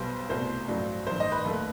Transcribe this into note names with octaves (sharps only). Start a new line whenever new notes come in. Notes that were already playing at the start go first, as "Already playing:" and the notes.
Already playing: B1 B2 G3 B3 C5
C2 B2 A3 C5
A1 G2 F#3
A1 G2 D#3 C5
D#5
B4
D#2 D#3 A3